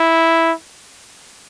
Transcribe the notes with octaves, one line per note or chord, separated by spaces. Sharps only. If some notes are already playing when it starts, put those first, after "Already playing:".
Already playing: E4